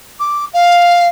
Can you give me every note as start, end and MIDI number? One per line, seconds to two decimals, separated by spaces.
0.19 0.45 86
0.53 1.08 77